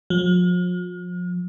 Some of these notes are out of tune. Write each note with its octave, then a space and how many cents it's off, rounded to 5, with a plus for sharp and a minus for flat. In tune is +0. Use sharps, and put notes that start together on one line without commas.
F3 +40